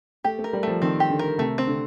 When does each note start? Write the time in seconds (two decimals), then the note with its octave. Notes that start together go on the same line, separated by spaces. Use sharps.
0.24 A3 G4
0.39 A3
0.44 A#4
0.53 G3
0.63 F3 A3
0.82 D#3 C4
1.00 G4
1.10 D3
1.19 A#4
1.38 C3 A3
1.58 C4
1.67 D3